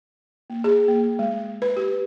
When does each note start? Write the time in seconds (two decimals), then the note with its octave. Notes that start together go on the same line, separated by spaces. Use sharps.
0.50 A#3
0.64 G#4
0.88 A#3
1.19 G#3
1.62 B4
1.77 G4